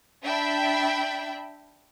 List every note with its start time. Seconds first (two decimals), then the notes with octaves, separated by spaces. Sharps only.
0.22 D4 E5 G5 B5